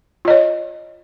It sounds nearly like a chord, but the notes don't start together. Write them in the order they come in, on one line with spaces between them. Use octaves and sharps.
F4 D#5 C#5